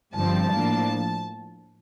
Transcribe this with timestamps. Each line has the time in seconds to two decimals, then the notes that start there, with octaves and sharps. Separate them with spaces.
0.15 G1 G2 F3 C4 A5
0.51 A2 F3 A#3 D4